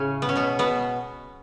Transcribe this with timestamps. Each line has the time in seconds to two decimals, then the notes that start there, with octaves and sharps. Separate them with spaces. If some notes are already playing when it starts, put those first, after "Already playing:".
Already playing: A2 C#3 C#4
0.22 B3
0.29 C#4
0.36 B2 B3
0.59 B2 B3